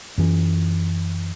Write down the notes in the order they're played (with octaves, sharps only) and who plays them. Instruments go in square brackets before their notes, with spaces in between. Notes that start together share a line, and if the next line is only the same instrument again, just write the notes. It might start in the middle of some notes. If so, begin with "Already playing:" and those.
[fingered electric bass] F#2 E3